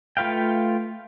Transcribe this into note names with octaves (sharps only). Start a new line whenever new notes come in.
A3 F4 B4 F5 G5